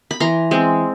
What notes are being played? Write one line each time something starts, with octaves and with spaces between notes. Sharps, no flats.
B5
E3 A#5 C6
G#3 C4